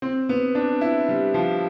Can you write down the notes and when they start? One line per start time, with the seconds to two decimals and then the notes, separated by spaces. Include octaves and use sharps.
0.02 C4
0.29 B3
0.55 D4
0.81 E4
1.09 G3
1.34 F3